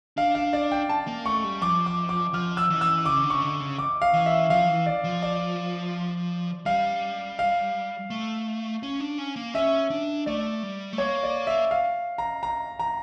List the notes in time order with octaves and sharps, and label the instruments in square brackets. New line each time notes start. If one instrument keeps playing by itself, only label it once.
[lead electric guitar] D4 [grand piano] F5
[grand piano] F5
D5
G5
A5
[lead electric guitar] A#3
[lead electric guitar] A3 [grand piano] C#6
[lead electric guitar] G3
[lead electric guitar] F3 [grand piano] D6
[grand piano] D6
D6
[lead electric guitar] F3 [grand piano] F6
[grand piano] E6
[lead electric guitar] E3
[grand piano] E6
[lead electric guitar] C#3 [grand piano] D6
[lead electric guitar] D3
[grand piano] C#6
[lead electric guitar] C#3
D3
C#3
[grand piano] D6
F5
[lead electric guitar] E3
[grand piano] E5
[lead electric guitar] F3 [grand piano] F5
[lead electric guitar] E3
[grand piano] D5
[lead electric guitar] F3
[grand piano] D5
[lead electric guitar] G3 [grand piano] F5
[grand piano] F5
[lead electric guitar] A3
C#4
D4
C#4
A#3
[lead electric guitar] C#4 [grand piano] E5
[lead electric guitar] D4
[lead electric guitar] A3 [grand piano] D5
[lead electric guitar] G3
A3
[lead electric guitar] A#3 [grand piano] C#5
[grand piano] D5
E5
F5
A#5
A#5
A#5